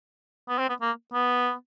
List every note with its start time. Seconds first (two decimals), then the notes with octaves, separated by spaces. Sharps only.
0.49 B3
0.58 C4
0.69 B3
0.81 A#3
1.13 B3